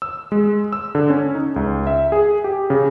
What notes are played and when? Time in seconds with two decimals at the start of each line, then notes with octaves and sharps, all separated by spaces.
0.02 E6
0.32 G#3
0.73 E6
0.95 D3
1.10 C#4
1.35 D#4
1.56 C#2
1.87 E5
2.12 G#4
2.44 G4
2.70 C#3